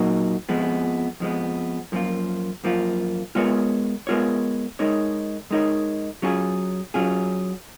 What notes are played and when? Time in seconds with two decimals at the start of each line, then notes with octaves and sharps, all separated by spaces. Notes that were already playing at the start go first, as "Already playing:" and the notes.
Already playing: A#2 F#3 A#3 D#4 F#4
0.49 F2 F3 G#3 B3
1.20 F2 F3 G#3 B3
1.92 F#2 F3 A#3 F4
2.64 F#2 F3 A#3 F4
3.35 G#3 B3 F4 A#4 C#5
4.07 G#3 B3 F4 A#4 C#5
4.79 G#3 D#4 A#4 C#5
5.51 G#3 D#4 A#4 C#5
6.22 F#3 C#4 F4 G#4
6.94 F#3 C#4 F4 G#4